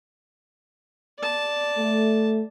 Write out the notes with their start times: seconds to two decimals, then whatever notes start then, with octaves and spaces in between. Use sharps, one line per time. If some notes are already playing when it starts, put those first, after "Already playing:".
1.18 D5 A5
1.78 A3